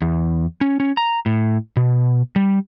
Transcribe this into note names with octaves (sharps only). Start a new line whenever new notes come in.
E2
C#4
C#4
A#5
A2
B2
G3